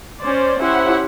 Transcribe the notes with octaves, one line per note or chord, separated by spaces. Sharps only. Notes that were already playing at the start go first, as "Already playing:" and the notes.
C#4 C5 D5
C#4 E4 G4 C5 F#5